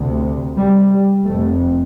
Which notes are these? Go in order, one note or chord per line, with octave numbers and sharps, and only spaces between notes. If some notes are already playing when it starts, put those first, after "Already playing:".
Already playing: D2 C3
G3
G3
F1 F2 C3 A3